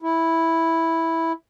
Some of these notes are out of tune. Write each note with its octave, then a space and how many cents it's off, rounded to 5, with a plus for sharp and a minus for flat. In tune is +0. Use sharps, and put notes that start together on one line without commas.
E4 -5